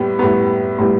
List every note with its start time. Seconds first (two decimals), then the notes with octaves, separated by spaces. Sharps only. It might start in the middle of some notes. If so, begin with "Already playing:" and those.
Already playing: A2 G3 B3
0.19 A2 G3 B3
0.79 A2 G3 B3